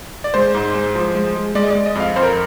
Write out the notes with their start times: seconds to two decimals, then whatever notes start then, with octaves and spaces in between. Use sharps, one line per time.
0.24 D5
0.34 G#3 C5
0.54 G#2
0.75 G#3
0.95 F3
1.15 G#3
1.35 G#3
1.55 G#3 D5
1.63 D#5
1.70 G#3 D5
1.86 D#5
1.95 F2 F5
2.16 F2 C5
2.23 A#4